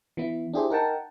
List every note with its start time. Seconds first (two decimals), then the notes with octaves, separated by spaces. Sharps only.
0.17 E3 B3 E4
0.53 D4 E4 G4 G#4 C5
0.70 D#4 A#4 F#5 G5 A5